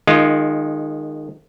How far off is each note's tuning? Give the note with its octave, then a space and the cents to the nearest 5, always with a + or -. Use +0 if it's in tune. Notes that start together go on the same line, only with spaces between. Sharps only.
D#3 -20 G#3 +0 F4 -5